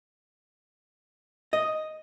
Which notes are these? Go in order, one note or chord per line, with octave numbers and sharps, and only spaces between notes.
D#5